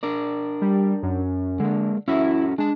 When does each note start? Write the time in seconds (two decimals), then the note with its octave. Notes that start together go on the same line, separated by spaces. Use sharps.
0.03 D4 A#4 D5
0.62 G3
1.03 F#2
1.60 D3 G#3 A#3
2.08 C#4 E4 F#4 A4
2.58 G#3 D4 A5